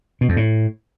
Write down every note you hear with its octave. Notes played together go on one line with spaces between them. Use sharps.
B2
F2
A2